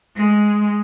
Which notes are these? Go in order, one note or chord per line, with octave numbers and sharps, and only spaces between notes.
G#3